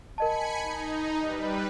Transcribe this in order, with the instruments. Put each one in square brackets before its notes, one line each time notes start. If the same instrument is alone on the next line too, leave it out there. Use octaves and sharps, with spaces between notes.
[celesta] A#4 D#5 A5 [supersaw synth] G#5 B5 C#7
[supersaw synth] D#4
G3 B4